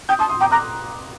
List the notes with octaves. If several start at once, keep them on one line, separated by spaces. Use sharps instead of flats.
G5 D#6 G6
A5 C6 D#6
C6 D#6
G5 A#5 D6
A#5 D6 F#6